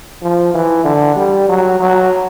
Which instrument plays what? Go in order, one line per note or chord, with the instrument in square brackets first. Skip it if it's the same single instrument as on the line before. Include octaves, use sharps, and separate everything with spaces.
[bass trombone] F3
E3
D3
G3
F#3
F#3